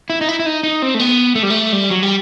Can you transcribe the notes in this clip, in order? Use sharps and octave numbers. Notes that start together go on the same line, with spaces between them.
E4
D#4
E4
E4
D#4
D#4
C4
A3
B3
A3
G3
A3
G3
F#3
G3